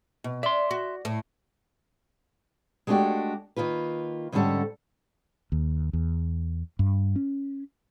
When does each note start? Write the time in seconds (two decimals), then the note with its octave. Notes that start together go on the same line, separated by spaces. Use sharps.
0.24 B2
0.43 D5 E5 C6
0.71 F#4
1.05 A2
2.87 G#3 A3 B3 D4 F#4 G4
3.56 D#3 A#3 F4 B4
4.32 G#2 D3 G3 C#4 A4 F#5
5.52 D#2
5.93 E2
6.79 G2
7.16 C#4